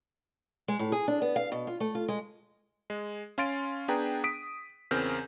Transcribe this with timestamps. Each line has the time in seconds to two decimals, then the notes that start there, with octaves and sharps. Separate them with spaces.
0.68 G#3
0.79 A2
0.92 G#4
1.08 D4
1.22 B3
1.36 F5
1.52 B2
1.67 F4
1.80 A3
1.95 F4
2.08 G#3
2.90 G#3
3.38 C#4 F5 C6 A6 D7
3.88 B3 D4 G#4 B4 G5 A#5
4.24 D#6 B6 D7
4.91 E2 C#3 C4 A#4 F6 G6